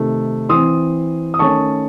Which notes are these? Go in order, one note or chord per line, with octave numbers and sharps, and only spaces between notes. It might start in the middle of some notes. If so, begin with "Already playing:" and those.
Already playing: C3 D#3 A3
E3 C4 C6 D#6
D#6
D#3 A3 C#4 A5 C#6